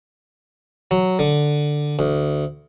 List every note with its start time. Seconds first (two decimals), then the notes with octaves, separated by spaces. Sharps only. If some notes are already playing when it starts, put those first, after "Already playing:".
0.91 F#3
1.19 D3
1.99 D2